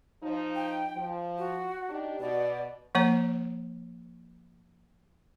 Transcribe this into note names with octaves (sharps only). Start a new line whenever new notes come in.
F3 D#4
G5
F3
F#4
D4 D#4 G4
B2 D5
F3 A#3 C#5 A#5